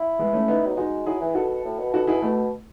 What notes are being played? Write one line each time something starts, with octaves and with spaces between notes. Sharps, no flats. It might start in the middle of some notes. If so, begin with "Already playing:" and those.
Already playing: E4
G#3 B3
A3 C#4
B3 D#4
F#3
G#3 D#4 F#4
F#3 E4 G#4
E3
B2 F#4 A4
A2
B2
B2 F#4 A4
B2 E4 G#4
B2 A3